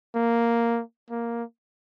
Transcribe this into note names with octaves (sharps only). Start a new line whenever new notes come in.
A#3
A#3